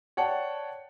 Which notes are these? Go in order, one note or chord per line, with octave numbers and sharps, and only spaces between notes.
C#5 D5 F#5 G5 A5